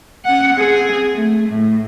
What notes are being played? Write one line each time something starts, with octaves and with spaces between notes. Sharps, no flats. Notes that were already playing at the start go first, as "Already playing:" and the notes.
C#4 F#5
C4 G#4
A3
A2